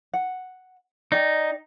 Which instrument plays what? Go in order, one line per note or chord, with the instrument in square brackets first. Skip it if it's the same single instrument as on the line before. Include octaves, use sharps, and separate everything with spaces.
[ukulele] F#5
[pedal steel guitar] D#4 [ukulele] D5 G5